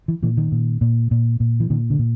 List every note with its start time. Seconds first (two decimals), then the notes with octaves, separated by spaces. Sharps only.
0.08 E3
0.23 A#2 E3
0.37 D#3
0.52 A#2
0.81 A#2
1.11 A#2
1.40 A#2
1.60 E3
1.70 A#2 D#3
1.90 D3
1.99 A#2